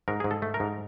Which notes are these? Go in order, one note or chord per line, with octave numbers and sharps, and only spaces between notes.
G#2 A#4
G#2 G#4
A4
A3
A#4
G#2